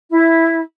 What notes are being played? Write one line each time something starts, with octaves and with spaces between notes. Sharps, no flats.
E4